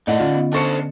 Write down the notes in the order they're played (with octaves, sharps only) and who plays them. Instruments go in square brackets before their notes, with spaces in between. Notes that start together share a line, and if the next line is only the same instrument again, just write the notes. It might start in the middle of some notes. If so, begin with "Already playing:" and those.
[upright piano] A2 [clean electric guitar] D#4 D5 F#5 [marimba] D#5
[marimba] D3 C#4 [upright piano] F4
[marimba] B3
[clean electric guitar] D4 A4 C5 [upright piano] A5 C#6 C#7